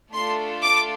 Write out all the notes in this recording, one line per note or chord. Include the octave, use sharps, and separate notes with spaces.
A3 D4 F4 A4 C6
D6